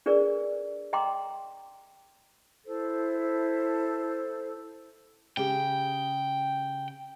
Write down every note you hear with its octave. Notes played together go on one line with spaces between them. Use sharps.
D4 G#4 A#4 B4 D5
D#5 G5 A#5 C6 D6
E4 A4 C5
C#3 G4 G5